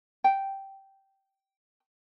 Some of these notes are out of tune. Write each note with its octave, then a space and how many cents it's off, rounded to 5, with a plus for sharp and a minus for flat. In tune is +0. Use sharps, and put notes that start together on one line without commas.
G5 -10